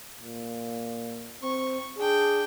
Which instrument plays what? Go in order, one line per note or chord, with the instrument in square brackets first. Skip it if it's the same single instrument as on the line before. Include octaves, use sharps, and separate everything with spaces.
[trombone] A#2
[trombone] C4 [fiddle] C#6
[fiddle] D4 G5 [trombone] G#4